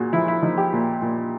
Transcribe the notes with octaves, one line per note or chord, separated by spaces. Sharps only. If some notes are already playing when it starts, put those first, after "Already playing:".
Already playing: A#2 F#4 G#4
F3 E4
E4
F3 D#4
G4
A#2
A#2